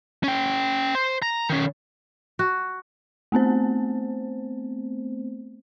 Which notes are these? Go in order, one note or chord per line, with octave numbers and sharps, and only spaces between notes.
C#4 G5
C5
A#5
D#3 C#4
F#4
A3 B3 C4 C5